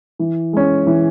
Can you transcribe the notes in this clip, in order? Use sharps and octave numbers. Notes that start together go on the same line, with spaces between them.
E3
G#3 C#4
E3